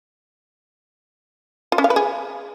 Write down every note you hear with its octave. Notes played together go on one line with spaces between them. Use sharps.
F4
C#4
F5
B4
G#4